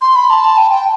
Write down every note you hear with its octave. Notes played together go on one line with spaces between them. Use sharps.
C6
B5
A5
G5
G5